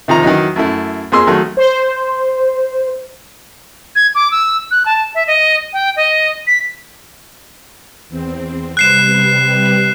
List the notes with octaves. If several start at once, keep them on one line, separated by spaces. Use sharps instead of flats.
C3 D#3 F3 A#5
D#3 E3 F#3 D#4
F#2 A3 E4
F2 A#3 G#4 C6 E6
D#3 F#3 A3
C5
G#6
D6
E6
F#6
A5
E5
D#5
G5
D#5
B6
E2 C4
C3 G3 B4 F#6 C7 E7